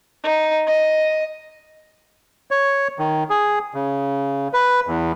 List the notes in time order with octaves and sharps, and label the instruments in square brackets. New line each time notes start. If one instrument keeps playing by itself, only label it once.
[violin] D#4
D#5
[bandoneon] C#5
D#3
G#4
C#3
B4
E2